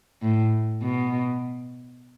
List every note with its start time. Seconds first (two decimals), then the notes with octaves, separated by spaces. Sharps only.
0.23 A2
0.83 B2